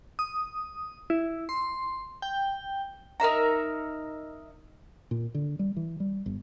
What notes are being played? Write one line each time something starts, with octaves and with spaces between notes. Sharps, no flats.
D#6
E4
C6
G5
D#4 A#4 E5 A#5
A#2
D3
G3
E3
G3
G1